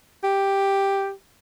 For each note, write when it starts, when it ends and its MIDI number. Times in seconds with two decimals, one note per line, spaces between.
0.24 1.12 67